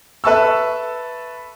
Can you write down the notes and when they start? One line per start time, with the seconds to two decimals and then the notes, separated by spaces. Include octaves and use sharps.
0.24 A4 B4 E5 A5 C#6 E6